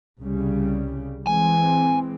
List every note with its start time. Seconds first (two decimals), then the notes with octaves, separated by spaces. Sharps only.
0.20 C2 C#3 G3
1.27 E3 G#3 C4 G#5